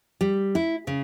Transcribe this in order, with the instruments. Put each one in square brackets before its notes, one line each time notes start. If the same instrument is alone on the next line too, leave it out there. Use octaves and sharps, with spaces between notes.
[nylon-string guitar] G3
E4
C#3